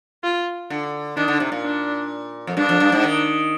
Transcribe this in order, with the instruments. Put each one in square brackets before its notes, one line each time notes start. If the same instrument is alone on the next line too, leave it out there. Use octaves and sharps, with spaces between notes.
[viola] F4
[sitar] D3
[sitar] D#3 [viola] D4
[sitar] D3
C3
A#2
[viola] D4
[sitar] F2
[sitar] G2 [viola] D4
[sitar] F2
G2
G#2
D#3